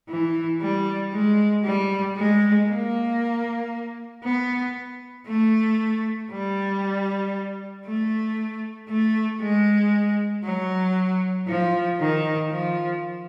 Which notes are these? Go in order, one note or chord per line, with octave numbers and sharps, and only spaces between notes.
E3
G3
G#3
G3
G#3
A#3
B3
A3
G3
A3
A3
G#3
F#3
F3
D#3
F3